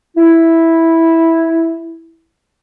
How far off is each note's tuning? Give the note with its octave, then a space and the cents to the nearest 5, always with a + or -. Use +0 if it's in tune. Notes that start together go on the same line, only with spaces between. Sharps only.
E4 -5